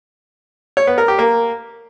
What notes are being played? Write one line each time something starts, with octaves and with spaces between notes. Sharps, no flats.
C#5
B3
A#4
G4
A#3